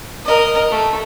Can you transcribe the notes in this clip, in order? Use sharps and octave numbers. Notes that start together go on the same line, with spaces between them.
A#4 D#5
A3